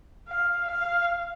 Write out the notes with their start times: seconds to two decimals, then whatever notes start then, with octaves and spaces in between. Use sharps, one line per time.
0.28 F5
0.68 F5